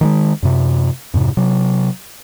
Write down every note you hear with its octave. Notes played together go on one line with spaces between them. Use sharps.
D#3 F#3 G#3
F#2 C3
F2 G#2 C3
C3 F#3